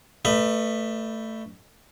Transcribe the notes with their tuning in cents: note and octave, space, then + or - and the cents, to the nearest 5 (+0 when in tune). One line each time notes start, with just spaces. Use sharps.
A3 +15 B4 +0 D#5 -40